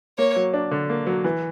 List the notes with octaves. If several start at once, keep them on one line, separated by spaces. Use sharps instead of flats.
A#3 C#5
F#3
D4
D3
A#3
F#3
E3